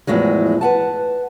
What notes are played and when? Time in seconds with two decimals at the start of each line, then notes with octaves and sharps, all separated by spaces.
0.07 E2 A2 F3 F#3 G#3
0.61 B4 F#5 A5